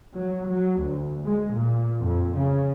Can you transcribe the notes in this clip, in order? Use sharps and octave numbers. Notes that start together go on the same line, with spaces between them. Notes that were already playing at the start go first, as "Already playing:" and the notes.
F#3
F#3
D2
G#3
A#2
F2
C#3